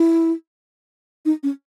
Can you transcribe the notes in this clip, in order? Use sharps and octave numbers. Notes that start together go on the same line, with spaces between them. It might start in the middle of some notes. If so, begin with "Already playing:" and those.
Already playing: E4
D#4
C#4